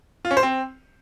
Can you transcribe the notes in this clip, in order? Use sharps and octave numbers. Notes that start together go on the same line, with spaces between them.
F4
C#4
C5
C4